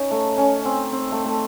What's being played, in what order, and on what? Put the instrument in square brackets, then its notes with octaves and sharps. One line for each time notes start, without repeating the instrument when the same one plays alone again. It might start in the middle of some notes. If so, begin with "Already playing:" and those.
Already playing: [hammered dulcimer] C#4 D#4
A3
C#4
C4
C4
A3
A3